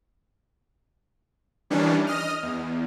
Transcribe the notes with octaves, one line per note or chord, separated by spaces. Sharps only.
D#3 E3 G3 C#4 D4
D#5 D#6 F6
E2